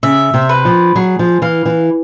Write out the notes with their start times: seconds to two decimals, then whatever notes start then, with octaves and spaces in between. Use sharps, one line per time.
0.03 C#3 E5
0.34 C3
0.49 B4
0.65 F3
0.96 F#3 G#4
1.19 F3
1.42 E3 F5
1.66 E3